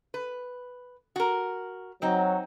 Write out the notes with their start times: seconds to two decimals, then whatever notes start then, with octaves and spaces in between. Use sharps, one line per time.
0.14 B4
1.16 F#4 A#4
2.02 F#3 C4 D#4